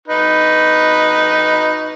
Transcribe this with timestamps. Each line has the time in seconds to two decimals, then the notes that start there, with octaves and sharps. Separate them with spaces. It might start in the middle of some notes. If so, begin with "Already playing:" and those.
0.08 D#4 B4